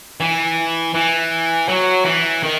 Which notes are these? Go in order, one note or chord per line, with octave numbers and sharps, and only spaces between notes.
E3
E3
F#3
E3
D#3